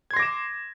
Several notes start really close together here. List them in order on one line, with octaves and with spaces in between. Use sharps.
G#6 C6 A#6 D6 E7